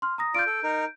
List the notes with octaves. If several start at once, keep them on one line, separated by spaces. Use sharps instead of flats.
C6 F6
A#5 D#6 A#6
F4 D5 G6 D7
A4
D#4 A#4